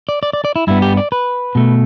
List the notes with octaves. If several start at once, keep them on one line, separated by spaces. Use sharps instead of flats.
D5
D5
D5
D5
E4
G2 G3 B3 E4
G4
D5
B4
B2 A3